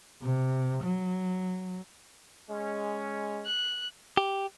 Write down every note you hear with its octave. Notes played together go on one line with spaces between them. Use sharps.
C3
F#3
G#3 C#4
F#6
G4